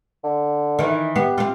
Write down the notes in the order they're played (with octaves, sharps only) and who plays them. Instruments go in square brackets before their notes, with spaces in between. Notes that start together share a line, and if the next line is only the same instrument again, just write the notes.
[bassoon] D3
[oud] D#3 E3
[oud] B3 [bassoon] G4
[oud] C4 F4